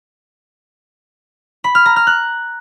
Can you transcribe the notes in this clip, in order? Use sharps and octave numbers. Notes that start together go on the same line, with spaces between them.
B5
F6
A#5
F6
F#6